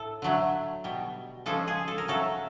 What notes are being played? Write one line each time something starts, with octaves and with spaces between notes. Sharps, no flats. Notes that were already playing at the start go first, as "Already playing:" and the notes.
Already playing: A2 A4
D3 F#3 A3
B2 G3
C#3 F3 G#3 A4
G#4
A4
A#4
C#3 F#3 A3 A4